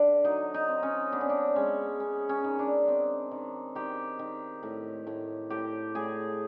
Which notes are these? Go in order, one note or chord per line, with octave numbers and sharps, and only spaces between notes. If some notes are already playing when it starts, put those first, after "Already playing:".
Already playing: D3 D4
F#3 D#4
D#4
C4
C#4
B3 D4
C#4
D4
G#3 C#4
B3 C#4
C#4
D#3
D4
C4
D#3
D#3 G4
D#3
A2
A2
A2 G4
A2 G#4